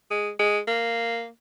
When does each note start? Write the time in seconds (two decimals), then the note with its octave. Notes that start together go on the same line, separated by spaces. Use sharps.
0.11 G#3
0.39 G#3
0.68 A#3